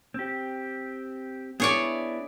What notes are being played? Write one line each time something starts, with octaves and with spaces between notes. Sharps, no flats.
C4 G4
B3 D4 E4 G#4 C#5 D5